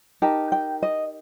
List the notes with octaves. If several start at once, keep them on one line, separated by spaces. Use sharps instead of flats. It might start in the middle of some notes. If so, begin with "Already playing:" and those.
D#4 G4 A#4 A5
G5
D#5